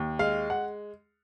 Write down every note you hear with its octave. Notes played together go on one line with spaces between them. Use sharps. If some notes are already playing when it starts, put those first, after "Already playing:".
Already playing: D#2
G#3 F5
F#5